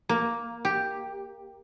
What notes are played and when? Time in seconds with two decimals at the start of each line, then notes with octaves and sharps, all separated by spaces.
0.09 A#3
0.65 G4